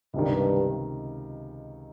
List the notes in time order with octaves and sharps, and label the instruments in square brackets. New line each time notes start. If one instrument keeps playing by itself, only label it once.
[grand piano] C#2 C3 D#3 [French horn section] G2